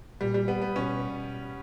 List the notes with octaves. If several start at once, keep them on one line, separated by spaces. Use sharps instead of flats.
A#2 G3
G3
B3
B3
B2 C#4